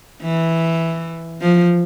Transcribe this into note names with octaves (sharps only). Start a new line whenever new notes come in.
E3
F3